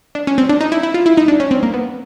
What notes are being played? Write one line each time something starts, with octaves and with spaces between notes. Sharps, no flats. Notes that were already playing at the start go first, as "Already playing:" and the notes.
D4
C#4
C4
D4
D#4
E4
E4
F4
E4
D#4
D4
C#4
C4
A#3
B3